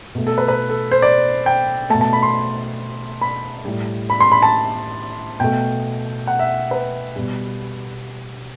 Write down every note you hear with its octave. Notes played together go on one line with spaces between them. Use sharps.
B2 A3
A4
B4
B4
A4
C5
D5
G5
B2 A3 A5
A5
B5
C6
B5
A2 G3
B5
C6
B5
A5
B2 A3 G5
F#5
E5
B4
B2 G3